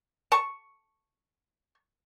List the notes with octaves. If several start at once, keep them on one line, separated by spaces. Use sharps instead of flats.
A5 C#6